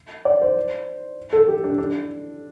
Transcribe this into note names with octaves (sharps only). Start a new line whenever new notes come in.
D5
C5
A4
G4
D4
D4